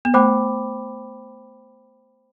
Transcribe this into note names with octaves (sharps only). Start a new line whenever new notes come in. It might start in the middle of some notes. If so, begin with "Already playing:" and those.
B3
A3 C5 G5 B5 D6